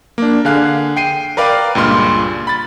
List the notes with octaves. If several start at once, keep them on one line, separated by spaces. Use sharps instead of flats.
A#3 D4
D3 G#4 F5 F#6
G5 C7 D#7
A#4 B4 D5 F5 G5
C#2 G2 A#2 C6 F6
B5 A6